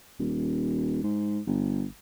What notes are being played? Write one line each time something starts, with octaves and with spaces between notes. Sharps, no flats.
D#1
G#2
G1